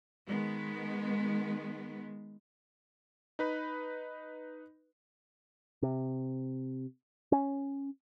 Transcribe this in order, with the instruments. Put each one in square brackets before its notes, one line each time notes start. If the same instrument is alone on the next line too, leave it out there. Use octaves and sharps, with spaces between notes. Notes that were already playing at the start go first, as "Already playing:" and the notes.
[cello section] D#3 G#3 B3
[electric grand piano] D#4 B4 B5
[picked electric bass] C3
C#4